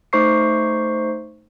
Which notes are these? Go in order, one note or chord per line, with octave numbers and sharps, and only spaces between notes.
A3 D#4 C5 C#6 C7